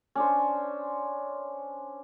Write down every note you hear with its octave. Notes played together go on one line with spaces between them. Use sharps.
C#4 D4 C5